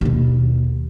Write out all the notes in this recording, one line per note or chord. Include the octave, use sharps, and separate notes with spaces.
D#2 B2